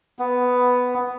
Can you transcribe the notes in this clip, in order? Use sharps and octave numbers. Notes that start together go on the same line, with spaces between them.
B3